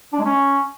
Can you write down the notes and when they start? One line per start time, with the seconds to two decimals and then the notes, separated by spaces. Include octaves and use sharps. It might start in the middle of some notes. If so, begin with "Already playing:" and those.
0.13 D4
0.19 G#3
0.25 C#4